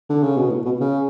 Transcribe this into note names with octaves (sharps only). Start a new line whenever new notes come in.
D3
C#3
B2
A2
B2
C#3